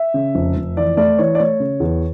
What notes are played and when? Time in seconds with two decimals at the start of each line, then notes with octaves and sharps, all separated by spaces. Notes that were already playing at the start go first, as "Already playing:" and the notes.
Already playing: E5
0.14 C#3
0.35 F1
0.56 F1
0.77 E3 D5
0.97 A3 D5
1.19 E3 C#5
1.35 D5
1.39 A3 C#5
1.60 C#3
1.80 E2